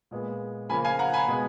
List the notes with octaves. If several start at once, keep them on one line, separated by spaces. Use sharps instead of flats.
A#2 G#3 B3
C#3 F3 A#3 G#5 B5
F5 G#5
F#5 A#5
G#5 B5
B2 G#3 B3